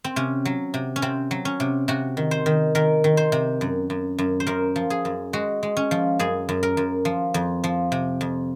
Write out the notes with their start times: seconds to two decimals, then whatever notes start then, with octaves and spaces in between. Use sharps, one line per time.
0.04 C4
0.16 C3 C#4
0.45 F#3
0.74 C3
0.96 C#4
1.02 C3 C4
1.31 F#3
1.45 C#4
1.60 C3
1.88 C3 F#4
2.17 D#3
2.31 C5
2.46 D#3
2.75 D#3 A#4
3.04 D#3
3.17 C5
3.32 C3
3.61 F#2
3.90 F#2
4.18 F#2
4.40 C5
4.47 F#2 A#4
4.76 F3
4.90 G#4
5.05 F#2
5.33 G#3 F#4
5.63 G#3
5.77 C#4
5.91 F3
6.19 F#2 G#4
6.49 F#2
6.63 A#4
6.77 F#2
7.05 F3
7.34 F2
7.64 F3
7.92 C3
8.21 F2